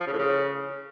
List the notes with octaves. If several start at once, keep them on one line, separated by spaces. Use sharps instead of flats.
F3
C#3
A2
C#3